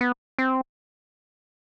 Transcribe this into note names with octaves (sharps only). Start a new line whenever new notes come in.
B3
C4